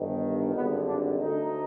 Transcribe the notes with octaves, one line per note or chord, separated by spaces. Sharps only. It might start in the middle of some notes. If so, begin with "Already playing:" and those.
Already playing: G1 G2 D#3
G#1 G2 D3 B3
D4
D2 D3 D#4